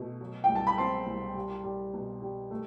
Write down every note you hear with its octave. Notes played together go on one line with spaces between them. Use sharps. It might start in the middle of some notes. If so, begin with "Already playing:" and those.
Already playing: B2 A3
F#3
G5
C2
A5
B5
C4 A5 C6
C2
G3
G3
B2
G3
A3